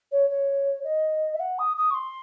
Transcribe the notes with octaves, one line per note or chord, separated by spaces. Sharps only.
C#5
C#5
D#5
E5
F#5
D#6
D#6
C#6
C6